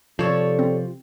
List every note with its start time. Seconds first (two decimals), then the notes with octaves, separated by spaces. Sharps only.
0.19 C3 F3 A4 C#5 D5
0.59 C4